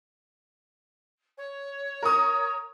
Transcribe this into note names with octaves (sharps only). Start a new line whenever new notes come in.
C#5
A#4 C#6 D#6